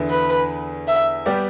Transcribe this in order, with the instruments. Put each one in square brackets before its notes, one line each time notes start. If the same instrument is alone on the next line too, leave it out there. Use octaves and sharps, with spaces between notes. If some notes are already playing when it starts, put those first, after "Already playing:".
Already playing: [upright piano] E2 D3 B3 E4
[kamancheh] B4
E5
[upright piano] G3 B3 G4 D5